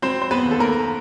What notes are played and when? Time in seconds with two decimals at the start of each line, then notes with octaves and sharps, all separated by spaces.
0.02 F#3 C4 C5
0.22 C5
0.31 B3 B4
0.45 D#2
0.51 A4
0.59 A#3 A#4